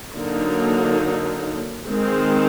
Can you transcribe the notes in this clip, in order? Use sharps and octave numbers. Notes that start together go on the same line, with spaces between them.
D3 F#3 A#3 D#4
D#3 G#3 C4